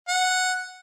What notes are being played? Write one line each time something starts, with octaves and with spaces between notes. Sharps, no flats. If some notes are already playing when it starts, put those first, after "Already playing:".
F#5